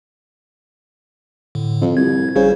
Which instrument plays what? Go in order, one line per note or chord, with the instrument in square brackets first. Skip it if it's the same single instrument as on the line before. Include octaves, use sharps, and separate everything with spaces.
[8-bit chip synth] A2 D3
[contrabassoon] F2
[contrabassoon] C2 [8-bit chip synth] G#6
[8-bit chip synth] G#1 G3 C5 [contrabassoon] C#3